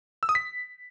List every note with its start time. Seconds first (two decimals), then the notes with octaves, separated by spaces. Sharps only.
0.23 E6
0.29 D#6
0.35 B6